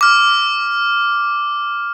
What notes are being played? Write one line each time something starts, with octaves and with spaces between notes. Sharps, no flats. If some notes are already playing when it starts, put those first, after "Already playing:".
D6 F6